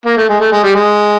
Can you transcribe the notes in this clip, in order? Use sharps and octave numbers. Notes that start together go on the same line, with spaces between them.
A#3
A3
G#3
A3
G#3
G3
G#3